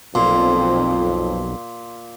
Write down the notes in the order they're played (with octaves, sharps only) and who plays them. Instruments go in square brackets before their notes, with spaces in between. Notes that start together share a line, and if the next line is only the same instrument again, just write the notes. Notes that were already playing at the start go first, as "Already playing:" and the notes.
[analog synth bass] B1 [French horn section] F2 [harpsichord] A#2 [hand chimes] C6